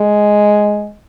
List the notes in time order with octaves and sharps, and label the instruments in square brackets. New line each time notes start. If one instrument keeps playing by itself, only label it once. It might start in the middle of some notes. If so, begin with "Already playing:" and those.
Already playing: [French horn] G#3